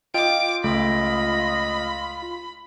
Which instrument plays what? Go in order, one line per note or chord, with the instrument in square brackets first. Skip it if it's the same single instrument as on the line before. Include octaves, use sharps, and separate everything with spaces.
[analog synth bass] F4 [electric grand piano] D#5 G5 [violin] D6 D7
[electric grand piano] C#2 A3 [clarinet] D#5 [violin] B5